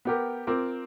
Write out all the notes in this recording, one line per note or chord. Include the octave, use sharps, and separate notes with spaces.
B3 G4 A#4
C4 F4 A#4 D6